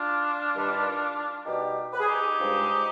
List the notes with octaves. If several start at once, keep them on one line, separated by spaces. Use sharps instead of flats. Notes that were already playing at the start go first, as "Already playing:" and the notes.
Already playing: D4 F4
G2 D#3 G3
B2 G3 D#4 G4
B4
G#4
D#4 G4
G2 F3 G#3